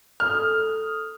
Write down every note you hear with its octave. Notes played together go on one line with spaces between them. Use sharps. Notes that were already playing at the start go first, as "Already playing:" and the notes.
A4 D#6 F6